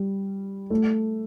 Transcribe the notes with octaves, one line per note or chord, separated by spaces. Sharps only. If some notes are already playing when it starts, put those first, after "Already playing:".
Already playing: G3
A3